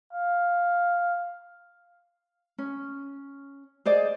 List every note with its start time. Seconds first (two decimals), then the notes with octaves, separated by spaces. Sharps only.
0.13 F5
2.58 C#4
3.86 G#4 C5 D5 D#5